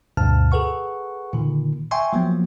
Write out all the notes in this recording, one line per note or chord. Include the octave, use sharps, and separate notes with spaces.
D2 G2 B2 A5 F6
G#4 A4 B4 F#5 C#6
A#2 D3 D#3
E5 G5 G#5 C6 C#6
F3 F#3 A#3 B3